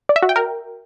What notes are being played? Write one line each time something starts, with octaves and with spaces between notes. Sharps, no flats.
D5
E5
F#4
G5
A#4